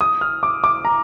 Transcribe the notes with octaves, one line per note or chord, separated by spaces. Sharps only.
D#6
F6
D6
D6
A#5